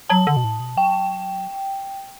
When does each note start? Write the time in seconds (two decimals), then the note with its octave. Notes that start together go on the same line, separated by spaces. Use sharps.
0.09 F#3 A5
0.27 D3
0.37 B2
0.44 A2
0.60 B2
0.77 F#3 G5